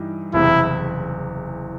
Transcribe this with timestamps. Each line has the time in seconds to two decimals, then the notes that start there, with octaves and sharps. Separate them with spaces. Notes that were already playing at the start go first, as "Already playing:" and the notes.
Already playing: G2 E3 G3 D#4
0.34 F#1 E2 C3 E3 E4